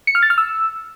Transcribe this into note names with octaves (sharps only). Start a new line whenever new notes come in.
C#7
F6
A6
F6
E6